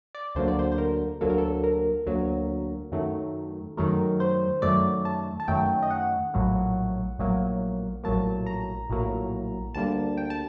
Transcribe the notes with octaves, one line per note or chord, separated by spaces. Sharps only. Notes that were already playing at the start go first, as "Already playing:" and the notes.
D5
D2 D3 F#3 A#3 C5
D5
C5
C5
A#4
D2 D3 F#3 A#3 A4
A#4
A4
A#4
D2 D3 F#3 A#3
F#2 D#3 F#3 A3
F#2 D#3 F#3 A3 A#4
C5
F#2 D#3 F#3 A3 D5
A5
A5
F#2 D#3 F#3 A3 G5
D#5
F#5
A#1 A2 F#3 A#3
A#1 A2 F#3 A#3
A#1 A2 F#3 A#3 A5
A#5
A#1 A2 F#3 A#3
D2 D3 G3 A#3 A5
G5
A5